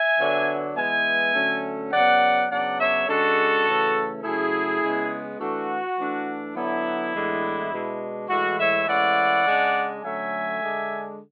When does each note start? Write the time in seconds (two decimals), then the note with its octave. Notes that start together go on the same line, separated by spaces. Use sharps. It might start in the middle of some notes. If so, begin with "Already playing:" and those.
Already playing: E5 G#5
0.18 D3 F#3 B3 D4
0.75 E3 G#3 B3 E5 G#5
1.34 D3 F#3 A3 C#4
1.92 C#3 F#3 B3 D5 F#5
2.50 C#3 F#3 B3 D4 D5 F#5
2.78 C#5 E5
3.07 C#3 G#3 D4 F#4 A4
3.66 C#3 E3 A3 C#4
4.23 C#3 F#3 A3 E4 G#4
4.82 C#3 G#3 B3
5.39 E3 A3 D4 F#4
5.98 E3 A3 D4
6.55 D3 F#3 B3 D4 E4
7.14 A2 E3 G#3 B3 D4
7.71 B2 G#3 D4
8.29 A2 E3 G#3 F#4
8.58 C#5 E5
8.87 A2 E3 G#3 C#4 D5 F#5
9.46 C#3 G#3 D4
10.03 D3 F#3 A3 C#4 E5 G#5
10.62 D3 G#3 D4